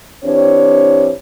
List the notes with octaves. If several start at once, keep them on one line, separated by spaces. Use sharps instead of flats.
E3 C4 D4 G4 C#5